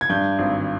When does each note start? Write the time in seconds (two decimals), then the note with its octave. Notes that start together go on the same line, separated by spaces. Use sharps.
0.01 G#6
0.10 G2 G6
0.39 G#1